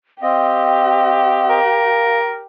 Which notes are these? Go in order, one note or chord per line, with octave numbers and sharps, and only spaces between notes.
C4 G4 D#5 F5
A#4